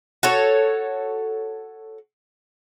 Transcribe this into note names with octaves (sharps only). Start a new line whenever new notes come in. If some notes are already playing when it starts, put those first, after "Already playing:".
F#4 A4 C#5